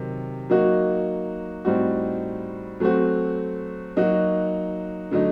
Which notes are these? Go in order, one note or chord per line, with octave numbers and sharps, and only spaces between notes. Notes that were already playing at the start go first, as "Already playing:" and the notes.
Already playing: C3 D#3 F#3
F#3 A#3 D#4 F#4
A2 G3 C4 D#4 F#4
F#3 A3 C4 F#4
F#3 A#3 D#4 F#4
D3 F#3 A3 D#4